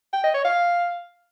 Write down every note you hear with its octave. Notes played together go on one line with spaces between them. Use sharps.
G5
D#5
C#5
F5